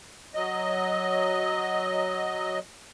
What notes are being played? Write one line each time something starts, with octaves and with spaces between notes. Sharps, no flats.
F#3 D#5